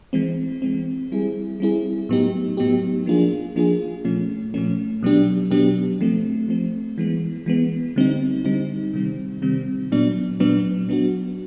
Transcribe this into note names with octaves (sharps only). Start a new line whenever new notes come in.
E3 G#3 C4
E3 G#3 C4
G3 C4 E4 G#4
G3 C4 E4 G#4
A2 F#3 B3 D#4 G4
A2 F#3 B3 D#4 G4
F3 A#3 D4 F4 G#4
F3 A#3 D4 F4 G#4
A#2 F3 A3 C#4
A#2 F3 A3 C#4
B2 F#3 B3 D4 G4
B2 F#3 B3 D4 G4
F3 A3 C4
F3 A3 C4
E3 G#3 B3
E3 G#3 B3
D3 G3 C4 D#4
D3 G3 C4 D#4
C3 D#3 G3 C4
C3 D#3 G3 C4
A#2 F#3 B3 D4
A#2 F#3 B3 D4
F#3 B3 D4 F#4